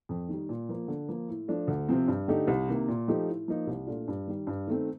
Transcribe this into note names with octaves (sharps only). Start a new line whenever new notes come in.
F2
D#3 G3
A#2
F3 A#3 F4
D3
F3 A#3
A2
F3 A3 D4
D2
C3 F3 C4
G2
D3 A3 D#4 G4
C2
C3 D#3 A#3
A#2
F3 A3 D#4 G4
A2
F3 A#3 D#4
C2
A#2 A3 D4 F4
G2
D#3 G3
G2
D#3 A3 C4